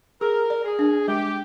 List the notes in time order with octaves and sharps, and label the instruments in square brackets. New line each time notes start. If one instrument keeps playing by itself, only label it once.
[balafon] G#4 [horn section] A#4
[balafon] D5
[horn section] G#4
[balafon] D4
[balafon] G#3 [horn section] G4